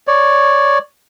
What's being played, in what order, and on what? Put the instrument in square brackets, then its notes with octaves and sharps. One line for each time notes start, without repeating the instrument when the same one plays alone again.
[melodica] C#5 D5